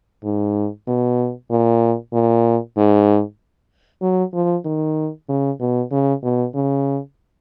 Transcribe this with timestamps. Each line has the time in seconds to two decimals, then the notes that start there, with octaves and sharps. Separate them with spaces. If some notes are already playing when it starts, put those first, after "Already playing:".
0.24 G#2
0.87 B2
1.51 A#2
2.13 A#2
2.77 G#2
4.02 F#3
4.34 F3
4.65 D#3
5.29 C#3
5.60 B2
5.92 C#3
6.24 B2
6.54 C#3